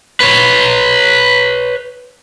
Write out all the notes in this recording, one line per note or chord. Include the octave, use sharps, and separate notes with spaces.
B4 C#5